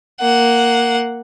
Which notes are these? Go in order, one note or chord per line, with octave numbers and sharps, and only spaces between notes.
A#3 F#5